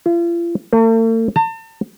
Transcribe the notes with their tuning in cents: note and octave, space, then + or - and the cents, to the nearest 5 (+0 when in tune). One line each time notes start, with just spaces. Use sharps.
F4 -40
A3 +45
A5 +40